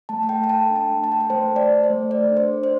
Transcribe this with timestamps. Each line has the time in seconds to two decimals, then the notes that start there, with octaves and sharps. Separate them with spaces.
0.09 A3 A5
0.23 A5
0.29 A4 G5
0.44 G5
0.49 A4 A5
0.70 D4
0.76 A5
0.90 A3
1.04 A5
1.10 A4 G5
1.20 A5
1.30 A3 C5
1.49 A3
1.56 D5
1.70 A4
1.84 C5
1.90 A3
2.10 A4 D5
2.31 D4
2.37 C5
2.51 D4
2.63 C5